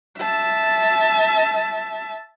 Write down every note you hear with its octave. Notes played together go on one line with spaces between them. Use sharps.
E5 A5